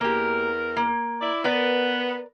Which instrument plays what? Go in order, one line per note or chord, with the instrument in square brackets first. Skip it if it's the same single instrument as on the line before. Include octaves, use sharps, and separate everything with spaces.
[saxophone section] E2 A#4 [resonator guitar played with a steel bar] A#3 G4
[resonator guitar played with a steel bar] A#3
[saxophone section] E4 D5
[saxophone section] B3 [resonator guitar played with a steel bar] A#4 B4 D5